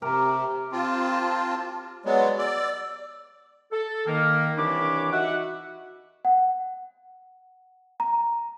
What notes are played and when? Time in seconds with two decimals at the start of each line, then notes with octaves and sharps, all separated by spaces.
0.02 C3 G4 A#4 A#5
0.72 C4 F4 A5
2.05 F#3 G#3 B3 D5
2.38 D5 E6
3.72 A4
4.07 D#3 A#3
4.58 C2 E3 D4 C#5 B5 D6
5.12 D#4 F#4 E5 F#5
6.25 F#5
8.00 A#5